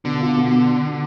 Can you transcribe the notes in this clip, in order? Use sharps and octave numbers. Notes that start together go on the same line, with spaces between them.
B2 D3
F4
B2
B2